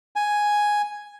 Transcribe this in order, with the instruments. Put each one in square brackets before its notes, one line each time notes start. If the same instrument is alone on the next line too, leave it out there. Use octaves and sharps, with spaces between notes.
[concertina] G#5